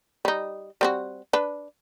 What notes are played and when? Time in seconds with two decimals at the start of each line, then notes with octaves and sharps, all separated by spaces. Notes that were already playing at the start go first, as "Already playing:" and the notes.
0.25 G3 D#4
0.81 G3 C4 F#4
1.33 D4 B4